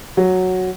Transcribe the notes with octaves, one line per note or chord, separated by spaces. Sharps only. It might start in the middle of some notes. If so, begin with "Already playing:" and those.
F#3